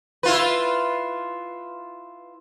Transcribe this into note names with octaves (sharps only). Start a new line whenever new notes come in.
E4 F4 B4